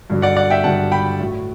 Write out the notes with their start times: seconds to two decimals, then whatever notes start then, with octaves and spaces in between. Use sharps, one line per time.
0.10 G2 D3 F#3
0.22 D5 F#5
0.36 D5 F#5
0.50 E5 G5
0.64 G2 D3 F#3 F#5 A5
0.92 G5 B5
1.20 A2 F#3